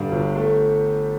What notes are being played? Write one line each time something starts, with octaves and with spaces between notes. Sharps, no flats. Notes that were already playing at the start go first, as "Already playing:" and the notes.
Already playing: G2 D3 G3
G1
A3